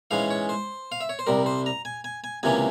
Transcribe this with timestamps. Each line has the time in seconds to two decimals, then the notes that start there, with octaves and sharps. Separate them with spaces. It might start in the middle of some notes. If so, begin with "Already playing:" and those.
0.11 G#2 E3 G#3 C#4 F5
0.30 C#5
0.49 C5
0.92 F5
1.01 E5
1.09 C#5
1.19 C5
1.27 C2 C3 G3 A#4
1.46 C5
1.66 A#5
1.85 G#5
2.04 G#5
2.24 G#5
2.43 C#2 C3 E3 A#3 C#4 G#5